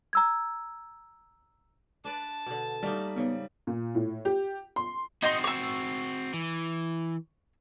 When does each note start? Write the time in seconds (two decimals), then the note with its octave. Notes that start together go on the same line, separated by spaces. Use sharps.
0.13 A#5 E6 G#6
2.05 D4 B4 D5 A5
2.46 B2 D3
2.83 G3 A3 A#3 D#4
3.16 G#2 C#3 B3
3.67 A#2
3.95 A2
4.25 G4
4.76 C6
5.22 C4 D#4 F#4 D#5 C6
5.44 C#6 E6
6.34 E3